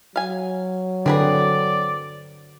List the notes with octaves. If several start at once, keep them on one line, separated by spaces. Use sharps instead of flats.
F#3 F5 G#5
D3 C4 G#4 B4 D5